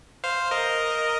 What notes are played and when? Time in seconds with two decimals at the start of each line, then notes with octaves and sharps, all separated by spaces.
0.24 C5 F5
0.51 A#4 D#5